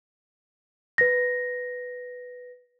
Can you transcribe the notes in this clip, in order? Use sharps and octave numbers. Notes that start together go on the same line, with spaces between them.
B4 A#6